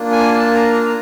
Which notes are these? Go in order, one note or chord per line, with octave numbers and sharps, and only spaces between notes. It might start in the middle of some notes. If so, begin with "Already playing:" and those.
Already playing: A#3 D4 F4
G#5
A5
A#5
A#5